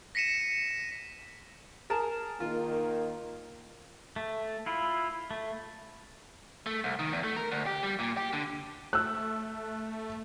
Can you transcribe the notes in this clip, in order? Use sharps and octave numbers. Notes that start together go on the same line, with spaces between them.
A#6 B6 C#7 D#7 E7
G#4 A#4 A5
D#3 A#3 F4
A3
E4 F4
A3
A3
C2
D#3
E2
A3
A#4
D2
G4
G3
A#2
G4
D3
A3 E6 F#6